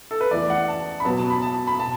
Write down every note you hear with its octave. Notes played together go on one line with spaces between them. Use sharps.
A4
B4
E2 E3 A3 D5
F#5
A5
B5
B2 F#3 B3 A5
A5
B5
A5
B5
B2 A5